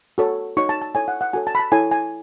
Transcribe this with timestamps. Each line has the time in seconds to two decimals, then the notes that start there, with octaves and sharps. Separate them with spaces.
0.18 F#4 A4 C#5
0.57 D#4 F#4 C#5 C#6
0.69 A5
0.82 A5
0.95 E4 A4 C#5 G#5
1.08 F#5
1.21 F#5
1.33 F#4 A4 C#5 G#5
1.47 A5
1.55 B5
1.60 A5
1.72 E4 A4 C#5 G#5
1.91 G#5